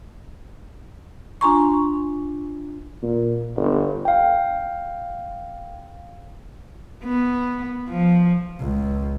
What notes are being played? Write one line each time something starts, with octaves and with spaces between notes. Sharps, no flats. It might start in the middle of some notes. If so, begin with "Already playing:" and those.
D4 F4 G#5 A#5 C6 C#6
A#2
G1
F5 G5
B3
F3
C#2